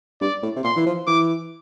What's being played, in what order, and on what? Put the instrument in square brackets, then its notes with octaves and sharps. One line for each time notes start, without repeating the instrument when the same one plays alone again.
[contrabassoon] G2 [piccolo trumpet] D5
[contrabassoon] A2
C3
[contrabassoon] A#2 [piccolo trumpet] C6
[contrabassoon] E3
F3
[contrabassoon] E3 [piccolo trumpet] D6